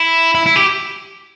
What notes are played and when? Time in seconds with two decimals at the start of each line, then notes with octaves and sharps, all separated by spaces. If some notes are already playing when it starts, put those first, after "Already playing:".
Already playing: E4
0.35 E4
0.46 E4
0.56 G4